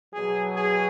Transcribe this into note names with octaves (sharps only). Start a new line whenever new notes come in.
B2 F#3 G#4
G#4